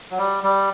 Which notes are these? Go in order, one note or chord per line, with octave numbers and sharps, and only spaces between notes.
F#3
G3
G3